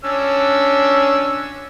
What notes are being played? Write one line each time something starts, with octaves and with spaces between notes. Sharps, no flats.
C#4 D4 E6